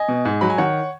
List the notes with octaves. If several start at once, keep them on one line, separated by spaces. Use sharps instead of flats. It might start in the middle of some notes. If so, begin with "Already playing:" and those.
Already playing: D#5 G#5
B2
G#2
F#3 B5
G#5
D#3 C#5 F#5